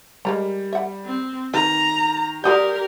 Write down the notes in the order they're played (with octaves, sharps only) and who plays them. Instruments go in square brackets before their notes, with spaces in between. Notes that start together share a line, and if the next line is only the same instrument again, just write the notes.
[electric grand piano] G3 [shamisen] G#3 A#4 A#5
[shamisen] E5 F#5
[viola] C4
[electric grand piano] D#3 [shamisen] B4 [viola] A#5
[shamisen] G3 F#4 D5 [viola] G4 A#4 [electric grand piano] C6 D#6 G6